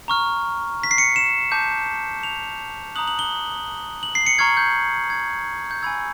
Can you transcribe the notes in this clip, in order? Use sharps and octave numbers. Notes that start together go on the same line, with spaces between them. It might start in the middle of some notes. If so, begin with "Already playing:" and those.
A#5 C#6 F6
B6
C7
C#7
E7
A5 D6 G6
F7
A#5 D#6 F#6 F#7
F#7
G7
F#7
C7
C#7
A#5 C#6 F6 G#6
G6
G#6
G6
G#5 B5 E6 G#6